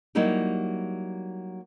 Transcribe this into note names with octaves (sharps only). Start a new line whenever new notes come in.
F#3 G3 A#3 D#4 E4 G4